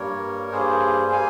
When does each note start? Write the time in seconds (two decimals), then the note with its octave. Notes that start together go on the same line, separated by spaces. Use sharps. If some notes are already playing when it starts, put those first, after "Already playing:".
Already playing: G2 G3 A#3 A#4 C#5
0.51 G2 G3 A#3 G#4 C5
1.11 G3 A#3 F5 G#5